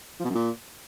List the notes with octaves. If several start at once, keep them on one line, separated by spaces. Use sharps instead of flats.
F3
B2
F#2
A#2